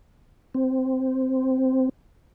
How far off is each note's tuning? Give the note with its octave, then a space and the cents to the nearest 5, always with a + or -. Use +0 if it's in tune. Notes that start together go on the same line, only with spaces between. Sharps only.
C4 -5